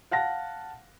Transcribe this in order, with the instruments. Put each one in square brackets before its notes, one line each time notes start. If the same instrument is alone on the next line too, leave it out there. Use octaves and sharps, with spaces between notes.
[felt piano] F5 F#5 A5 A#6